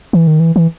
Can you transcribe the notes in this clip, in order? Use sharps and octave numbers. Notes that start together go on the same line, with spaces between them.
E3
D#3
E3
E3